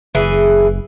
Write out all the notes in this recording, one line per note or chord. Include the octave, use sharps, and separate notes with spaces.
F#1 E3 G#4